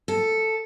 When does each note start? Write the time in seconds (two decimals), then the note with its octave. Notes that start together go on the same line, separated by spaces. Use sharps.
0.08 A4